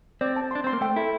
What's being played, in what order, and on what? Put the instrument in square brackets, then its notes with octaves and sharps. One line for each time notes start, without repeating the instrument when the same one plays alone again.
[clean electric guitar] C4 [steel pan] D5
[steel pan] A5
[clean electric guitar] D4 [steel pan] C6
[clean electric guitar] C4 [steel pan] C6
[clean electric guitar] A#3
[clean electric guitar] A3 [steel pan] G5
[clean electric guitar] E4 [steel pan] A4